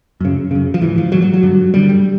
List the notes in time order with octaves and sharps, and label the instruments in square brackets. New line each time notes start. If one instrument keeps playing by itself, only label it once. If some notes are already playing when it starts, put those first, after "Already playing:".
[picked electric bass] F#2 C#3
F#2 C#3
F3
G#2 E3
F3
G#2 F#3
F#3
F#3
G2 D3
G2 D3 G3
G3